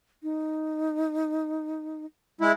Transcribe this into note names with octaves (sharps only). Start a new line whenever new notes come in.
D#4
G#3 E4